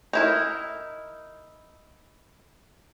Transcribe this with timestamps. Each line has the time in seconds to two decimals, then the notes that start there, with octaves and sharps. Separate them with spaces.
0.13 D#4 E4 A#4